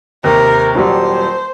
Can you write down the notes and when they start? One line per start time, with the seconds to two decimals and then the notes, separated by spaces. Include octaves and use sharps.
0.24 D#2 C3 A#4
0.75 D#1 F#3 G3 C5